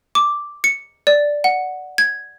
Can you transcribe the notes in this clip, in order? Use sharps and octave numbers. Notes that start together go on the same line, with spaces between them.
D6
C#7
D5
F#5
G#6